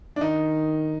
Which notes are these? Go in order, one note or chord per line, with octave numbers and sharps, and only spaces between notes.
D4
D#3 D#4